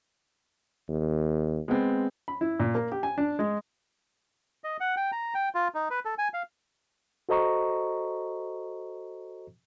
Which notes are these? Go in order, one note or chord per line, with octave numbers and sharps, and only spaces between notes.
D#2
G#3 B3 C4
B5
E4
A#2
A#3
G4
G#5
D4
G#3
D#5
F#5
G5
A#5
G5
F4
D#4
B4
A4
G#5
F5
F#4 A4 C5 D#5 A#5 C#6